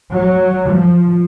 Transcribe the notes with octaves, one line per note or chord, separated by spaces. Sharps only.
F#3
F3